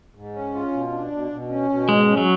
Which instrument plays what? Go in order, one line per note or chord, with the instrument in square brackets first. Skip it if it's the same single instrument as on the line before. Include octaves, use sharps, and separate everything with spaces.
[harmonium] G#2
C#4
F4
B2
D4
B2
B2
C#4
B2
[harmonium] G#2 [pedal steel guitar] G#3
[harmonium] C#4
[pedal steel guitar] F#3